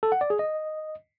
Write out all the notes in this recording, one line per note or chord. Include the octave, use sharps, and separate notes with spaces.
A4
F#5
D5
G#4
D#5